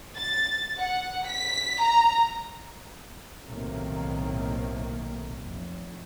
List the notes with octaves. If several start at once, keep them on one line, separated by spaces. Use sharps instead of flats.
A6
F#5
B6
A#5
B1 A2 C3 D#3 A#3
F1